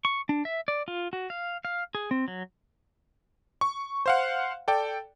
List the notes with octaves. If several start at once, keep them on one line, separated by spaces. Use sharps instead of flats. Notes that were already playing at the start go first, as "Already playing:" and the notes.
C#6
D4
E5
D5
F4
F#4
F5
F5
G#4
C4
F#3
C#6
C5 F5 F#5
A4 D5 G5